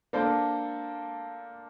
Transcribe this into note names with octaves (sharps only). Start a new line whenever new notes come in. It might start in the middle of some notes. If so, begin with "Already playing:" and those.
A#3 D4 A4 C5